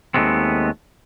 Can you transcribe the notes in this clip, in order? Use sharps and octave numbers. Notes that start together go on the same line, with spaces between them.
D#2 A#2 G#3 A3 B3 C4